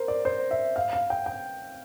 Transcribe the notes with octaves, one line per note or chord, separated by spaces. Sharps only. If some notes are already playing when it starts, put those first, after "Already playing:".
Already playing: A#4 C5
D5
C5
E5
F5
F5
G5
G5